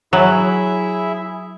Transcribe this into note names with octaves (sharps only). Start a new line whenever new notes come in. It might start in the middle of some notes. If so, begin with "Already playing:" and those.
F#3 E4 G#4 E5